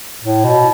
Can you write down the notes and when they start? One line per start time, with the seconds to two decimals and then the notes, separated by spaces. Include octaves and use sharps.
0.22 A2
0.45 B2